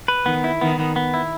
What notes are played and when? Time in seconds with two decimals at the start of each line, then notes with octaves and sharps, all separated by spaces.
0.08 B4
0.26 D#3 B3
0.44 E4
0.61 D#3 B3
0.80 B3
0.96 B3
1.14 E4